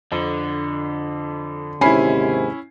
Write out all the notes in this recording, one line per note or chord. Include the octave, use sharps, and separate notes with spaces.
F2 D3
D#2 G#2 C3 C#4 E4 G#5 B5 C7